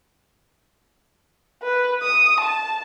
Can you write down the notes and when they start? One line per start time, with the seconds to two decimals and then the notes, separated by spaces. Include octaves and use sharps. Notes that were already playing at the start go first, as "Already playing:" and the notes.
1.63 B4
2.02 D#6
2.40 A5